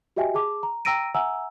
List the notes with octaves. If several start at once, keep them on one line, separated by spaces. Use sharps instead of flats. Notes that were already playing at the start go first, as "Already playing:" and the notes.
F#4 G4 D#5 E5 G5 G#5
G#4 A5 D6
A#5
G5 A#5 E6 A#6 D7 D#7
E5 F#5 G#5 A#5 E6